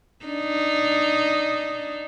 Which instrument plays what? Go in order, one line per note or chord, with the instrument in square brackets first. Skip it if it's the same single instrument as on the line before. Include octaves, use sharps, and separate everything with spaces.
[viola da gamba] D4 D#4